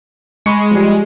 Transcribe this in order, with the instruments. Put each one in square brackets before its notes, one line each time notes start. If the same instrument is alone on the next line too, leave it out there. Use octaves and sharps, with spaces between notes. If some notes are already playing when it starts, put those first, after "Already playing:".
[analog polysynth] G#3 [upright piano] B5 C#6 C#7
[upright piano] F3 G3